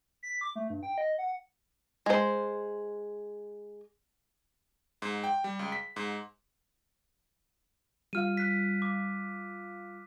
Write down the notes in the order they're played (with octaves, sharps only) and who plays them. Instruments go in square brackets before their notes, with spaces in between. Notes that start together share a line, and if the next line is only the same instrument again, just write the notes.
[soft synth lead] B6
D6
A3
G2
G5
D#5
F#5
[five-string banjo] G#3 C5
[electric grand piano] G#2
G5
G3
C#2
B6
G#2
[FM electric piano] G3 F4 F5 [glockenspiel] F6 D#7
[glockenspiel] F#6 B6
D6